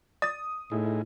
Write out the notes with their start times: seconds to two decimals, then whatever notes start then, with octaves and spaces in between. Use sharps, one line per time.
0.22 D5 D#6 A6
0.72 A2 D#4 E4 G#4